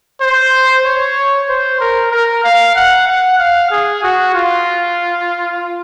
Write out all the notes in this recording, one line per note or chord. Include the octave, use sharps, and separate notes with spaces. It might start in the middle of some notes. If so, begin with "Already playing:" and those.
C5
C#5
C5
A#4
A#4
F5
F#5
F#5
F5
G#4
F#4
F4